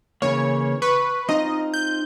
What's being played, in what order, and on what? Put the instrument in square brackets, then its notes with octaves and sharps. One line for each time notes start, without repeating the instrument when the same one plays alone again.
[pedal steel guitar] C#3 E3 A#3 [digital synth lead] C#5
[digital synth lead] B4 [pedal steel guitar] C#6
[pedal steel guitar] C4 D#4 F4 [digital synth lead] D#5
[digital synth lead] G6